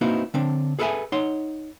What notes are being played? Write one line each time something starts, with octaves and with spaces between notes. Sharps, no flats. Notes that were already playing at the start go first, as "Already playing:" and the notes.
A#3 C4 D#4 E4 F#4 B4
D3 C4 D4
G#4 A4 B4 C#5 E5 G#5
D#4 C#5 F#5 C6